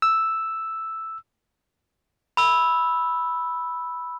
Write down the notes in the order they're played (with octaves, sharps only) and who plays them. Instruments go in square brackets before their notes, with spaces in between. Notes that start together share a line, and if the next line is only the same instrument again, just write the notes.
[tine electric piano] E6
[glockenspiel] B5 E6